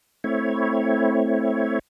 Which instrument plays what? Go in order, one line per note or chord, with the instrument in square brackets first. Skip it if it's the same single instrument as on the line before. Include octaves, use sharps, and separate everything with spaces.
[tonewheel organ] A3 C4 E4 C#5